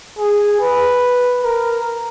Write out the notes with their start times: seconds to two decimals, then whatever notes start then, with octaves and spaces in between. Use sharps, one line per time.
0.19 G#4
0.60 B4
1.44 A#4